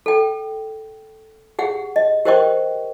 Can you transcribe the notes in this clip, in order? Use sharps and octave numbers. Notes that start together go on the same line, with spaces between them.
A4 G5
G4 G#4 F#5
D#5
G4 A#4 C5 D#5 G5 C#6